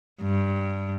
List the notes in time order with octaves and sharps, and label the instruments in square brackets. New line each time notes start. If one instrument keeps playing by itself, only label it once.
[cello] G2